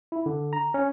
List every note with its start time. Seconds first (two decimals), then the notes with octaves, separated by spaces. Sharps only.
0.12 E4
0.26 D3
0.53 A#5
0.74 C#4